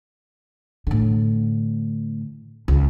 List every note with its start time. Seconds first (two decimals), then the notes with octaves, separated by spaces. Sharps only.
0.87 A2 D3
2.68 C#2